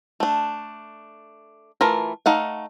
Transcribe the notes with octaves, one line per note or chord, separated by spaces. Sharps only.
A3 D4
E3 A3 F4 A#4
A3 D#4 F5 F#5